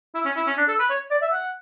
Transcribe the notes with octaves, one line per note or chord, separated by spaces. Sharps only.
E4
C#4
E4
C#4
D4
A4
B4
C#5
D5
E5
F#5